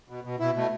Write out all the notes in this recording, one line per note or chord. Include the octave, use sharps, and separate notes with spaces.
B2
B2
B2 E4
B2 A3